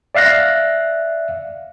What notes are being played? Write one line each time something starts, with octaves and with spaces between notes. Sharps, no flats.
D5 E5 F5 F#6 A#6